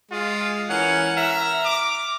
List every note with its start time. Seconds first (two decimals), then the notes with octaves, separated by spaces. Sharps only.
0.11 G#3 F4 G#4
0.70 E3 C#4 A#4 F#5
1.16 E5 A#5 F6
1.65 D6